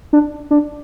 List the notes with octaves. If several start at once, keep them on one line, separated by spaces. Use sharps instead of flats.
D4
D4